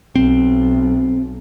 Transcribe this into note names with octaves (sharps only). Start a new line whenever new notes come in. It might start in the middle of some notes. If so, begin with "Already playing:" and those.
B1 C4